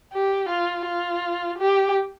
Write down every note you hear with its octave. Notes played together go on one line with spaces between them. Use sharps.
G4
F4
F4
G4